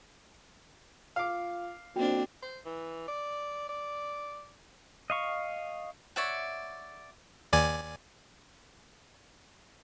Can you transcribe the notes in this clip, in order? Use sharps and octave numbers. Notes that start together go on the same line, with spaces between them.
F4 F5 D6
F2 A#3 C4 D4 F#4 G5
C5
E3
D5
D5
D#5 F5 C#6
C#5 D5 E5 F#5
D#2 D5 G#5